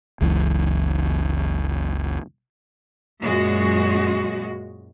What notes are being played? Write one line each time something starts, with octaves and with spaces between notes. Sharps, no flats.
F#1 C#2 F#2 E3
F#2 A#2 G#3 F#4